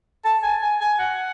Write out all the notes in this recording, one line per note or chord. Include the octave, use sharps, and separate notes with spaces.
A5
G#5
G#5
G#5
F#5